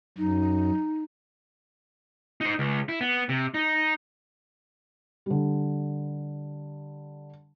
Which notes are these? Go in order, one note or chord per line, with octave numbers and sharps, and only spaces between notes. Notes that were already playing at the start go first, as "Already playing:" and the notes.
F#2 D#4
D#4 C5
C#2
E4
B3
C3
D#4
D3 G3